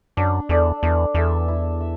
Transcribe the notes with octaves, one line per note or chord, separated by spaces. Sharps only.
F#2 D4
E2 A4 D5
E2 D4
E2 A4 E5
E4
E5